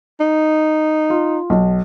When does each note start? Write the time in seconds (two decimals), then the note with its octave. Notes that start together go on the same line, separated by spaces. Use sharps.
0.20 D#4
1.10 F4
1.50 B1